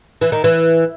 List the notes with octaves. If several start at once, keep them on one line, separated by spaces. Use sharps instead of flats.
E3
D#3
E3